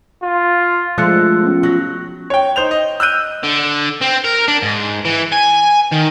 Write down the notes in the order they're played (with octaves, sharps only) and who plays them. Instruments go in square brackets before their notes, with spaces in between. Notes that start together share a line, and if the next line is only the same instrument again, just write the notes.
[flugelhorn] F4
[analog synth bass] F3 [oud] G#3 A3 D4 [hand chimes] E6 F#6 C#7
[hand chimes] B3 C#4
[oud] F#3 [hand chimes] F#6 A#6
[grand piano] C#5 G5
D#4 C5 G6 F7
D#5
E6 F#6 G6 D#7
[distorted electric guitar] D3
C4
A#4
D4
G#2
E3
G#5
D#3